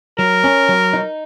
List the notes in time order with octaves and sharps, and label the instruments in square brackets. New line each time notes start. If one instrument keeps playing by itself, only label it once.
[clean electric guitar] F#3 [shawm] A#4
[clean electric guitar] C#4
F#3
D#4